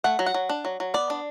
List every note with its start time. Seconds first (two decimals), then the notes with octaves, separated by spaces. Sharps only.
0.04 A3 F#5
0.19 F#3
0.26 F#5
0.34 F#3
0.49 D4
0.65 F#3
0.80 F#3
0.94 B3 D5
1.10 D4